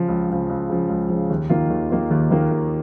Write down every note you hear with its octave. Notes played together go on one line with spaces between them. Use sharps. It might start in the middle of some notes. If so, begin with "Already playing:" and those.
Already playing: C#3 F3
C#2
C#3 F3
C#2
C#3 F3
C#2
C#3 F3
D#2
D#3 A#3 F4
D#2
D#3 A#3 F4
D#2
D#3 A#3 F4
D#2